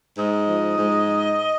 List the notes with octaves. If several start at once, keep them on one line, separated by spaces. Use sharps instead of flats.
G#2 D#5
F3
G#2